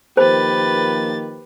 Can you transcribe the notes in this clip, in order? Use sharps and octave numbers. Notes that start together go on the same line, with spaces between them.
D#3 F3 A#3 G4 B4 C5 A6